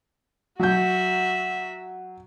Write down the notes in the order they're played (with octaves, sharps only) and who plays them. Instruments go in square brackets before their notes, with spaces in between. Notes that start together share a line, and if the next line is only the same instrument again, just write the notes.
[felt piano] F#3 G6 [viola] F#4 E5